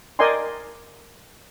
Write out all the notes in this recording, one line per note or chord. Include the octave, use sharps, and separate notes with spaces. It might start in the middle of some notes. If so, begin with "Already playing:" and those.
A#4 D5 D#5 G5 G#5 C6